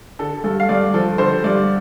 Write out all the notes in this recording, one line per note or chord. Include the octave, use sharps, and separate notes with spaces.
D3 A4
G2 A4
F5
G2 D5
F3 A4
D3 C5
G2 D5